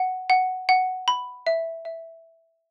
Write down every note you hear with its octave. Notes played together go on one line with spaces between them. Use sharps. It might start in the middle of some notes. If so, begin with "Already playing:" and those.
Already playing: F#5
F#5
F#5
B5
E5
E5